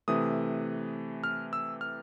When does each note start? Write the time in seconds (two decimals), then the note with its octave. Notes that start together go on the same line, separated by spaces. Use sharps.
0.08 C3 E3 A3 D#6
1.24 F6
1.53 E6
1.81 F6